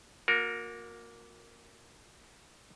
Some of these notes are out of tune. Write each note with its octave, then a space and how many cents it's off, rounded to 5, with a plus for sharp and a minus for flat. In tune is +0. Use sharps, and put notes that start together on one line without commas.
A#3 +0 F#4 -40 A#4 +0